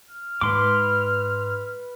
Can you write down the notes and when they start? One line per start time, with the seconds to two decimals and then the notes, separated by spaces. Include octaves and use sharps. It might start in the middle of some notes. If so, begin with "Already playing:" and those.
0.11 F6
0.41 G#2 B4 C6 D6